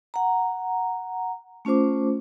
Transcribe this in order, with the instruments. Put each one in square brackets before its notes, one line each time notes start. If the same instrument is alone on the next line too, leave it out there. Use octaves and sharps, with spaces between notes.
[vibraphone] F#5 A#5
A3 C#4 F4 C5 D6